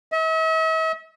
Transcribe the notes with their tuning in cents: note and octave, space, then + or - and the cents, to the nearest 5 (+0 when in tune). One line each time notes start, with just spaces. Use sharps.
E5 -45